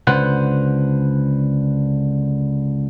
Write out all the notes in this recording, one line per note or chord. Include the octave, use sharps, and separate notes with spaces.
C#2 D3 B4 C5 F#5